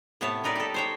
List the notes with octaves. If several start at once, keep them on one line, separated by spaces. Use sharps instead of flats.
A2 C3 B3 C#5 A5
G3 D#4 A#4 B4 D5
G4 A4
C5 C#5 G5